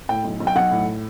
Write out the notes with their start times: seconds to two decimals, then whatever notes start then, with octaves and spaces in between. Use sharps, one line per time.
0.09 A2 G5
0.24 B1
0.40 B1
0.47 G5
0.56 B1 F#5
0.71 A2